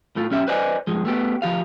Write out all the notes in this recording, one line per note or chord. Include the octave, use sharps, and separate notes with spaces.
A2 A3 F4
B1 C#4 G4 E5
B4 C5 D5 D#5 G#5
G2 F3 G#3
A3 B3 G4
D2 F3 G4 F5